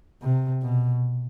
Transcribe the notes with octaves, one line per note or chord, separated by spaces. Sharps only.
C3
B2